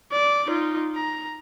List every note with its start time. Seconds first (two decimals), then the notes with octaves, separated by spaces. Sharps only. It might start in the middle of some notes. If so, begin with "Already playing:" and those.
0.13 D5
0.47 D#4 F4
0.96 A#5